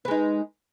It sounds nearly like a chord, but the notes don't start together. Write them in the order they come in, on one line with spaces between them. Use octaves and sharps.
B4 G#3 D#4